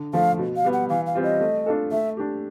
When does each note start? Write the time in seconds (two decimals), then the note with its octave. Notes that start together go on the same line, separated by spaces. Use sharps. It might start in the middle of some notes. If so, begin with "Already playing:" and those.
Already playing: D3
0.13 F3 A3 F5
0.39 B2
0.56 F5
0.65 G3 B3
0.73 F#5
0.89 E3 F5
1.06 F5
1.15 G3 C4 F4
1.23 D#5
1.41 A3
1.66 D4 F4 A4
1.92 A3 E5
2.17 D4 G4